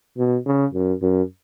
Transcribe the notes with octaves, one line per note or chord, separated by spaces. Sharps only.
B2
C#3
F#2
F#2